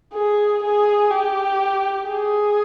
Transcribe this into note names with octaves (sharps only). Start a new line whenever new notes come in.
G#4
G#4
G4
G#4